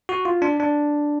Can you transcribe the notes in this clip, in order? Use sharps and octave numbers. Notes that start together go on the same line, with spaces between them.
F#4
F4
D4
D4